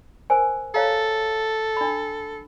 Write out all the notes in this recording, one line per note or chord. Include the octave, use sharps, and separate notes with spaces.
A#4 C5 G#5
A4 C#5 F5 A#5
D4 B5